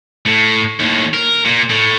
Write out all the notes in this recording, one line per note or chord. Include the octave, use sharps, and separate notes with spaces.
A2
D#2 A2
A#4
A#2
A2